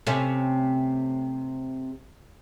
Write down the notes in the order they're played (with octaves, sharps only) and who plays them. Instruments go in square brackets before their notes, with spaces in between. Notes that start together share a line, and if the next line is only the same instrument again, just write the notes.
[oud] C3 A3 C#4